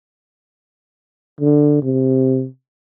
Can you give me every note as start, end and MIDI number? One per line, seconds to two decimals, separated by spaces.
1.41 1.79 50
1.82 2.46 48